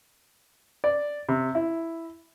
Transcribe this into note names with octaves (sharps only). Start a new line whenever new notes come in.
D5
C3
E4